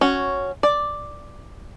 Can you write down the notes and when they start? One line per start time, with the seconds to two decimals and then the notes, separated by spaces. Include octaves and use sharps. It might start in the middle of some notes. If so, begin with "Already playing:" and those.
0.01 C#4 F#4
0.63 D5